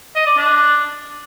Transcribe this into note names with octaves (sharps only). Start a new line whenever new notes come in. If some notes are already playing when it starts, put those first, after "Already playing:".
D#5
D5
D4